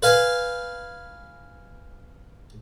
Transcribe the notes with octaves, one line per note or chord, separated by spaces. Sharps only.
B4 F5 G#5